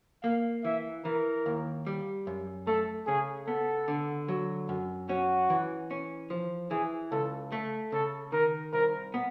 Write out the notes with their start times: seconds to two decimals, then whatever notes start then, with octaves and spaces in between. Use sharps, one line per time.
0.24 A#3 F5
0.65 E3 E5
1.05 E3 A#4
1.46 D#2
1.86 G3
2.27 F#2
2.67 A3 A4
3.07 C#3 G#4
3.47 B3 A4
3.88 D3
4.28 F#3
4.69 F#2
5.09 C#4 F#4
5.50 E3
5.91 C#4
6.30 F3
6.71 E3 G#4
7.12 C#2 A4
7.52 A3 A4
7.92 C#3 A4
8.32 D#3 A#4
8.73 C2 A#4
9.14 B3